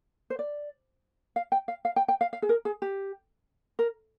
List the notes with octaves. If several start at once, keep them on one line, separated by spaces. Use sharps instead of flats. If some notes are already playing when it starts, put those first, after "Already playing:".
C5
D5
F5
G5
F5
F5
G5
G5
F5
F5
G#4
A#4
G#4
G4
A#4